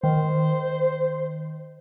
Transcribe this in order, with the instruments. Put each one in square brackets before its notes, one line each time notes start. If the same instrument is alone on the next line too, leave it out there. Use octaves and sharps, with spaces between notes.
[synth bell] D#3 [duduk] C5